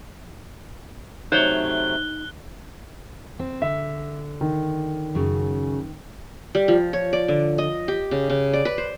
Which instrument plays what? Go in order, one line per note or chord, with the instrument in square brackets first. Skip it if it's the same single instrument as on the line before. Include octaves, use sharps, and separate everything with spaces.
[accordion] C3 F#3 A3 [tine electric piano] D#4 [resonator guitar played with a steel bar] C5 C#5 [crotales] F#6 G7
[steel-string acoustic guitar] C4
[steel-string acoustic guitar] D3 [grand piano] E5
[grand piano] D#3
[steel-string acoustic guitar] F#2 C#3
[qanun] G3
F3
C#5
D5
D3
D#5
G4
C#3
C#3
D5
B4
C5